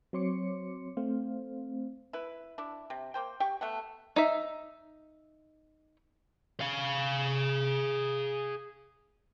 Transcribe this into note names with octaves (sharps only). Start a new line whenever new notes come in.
F#3 C4 C#5 C6 D6 C#7
A3 C4 C5 F5
E4 B4
D4 E4
C3
A#3 C5 G5
G4 G5 C#6
A3 B3 F#5
D#4 E5
G#4 F5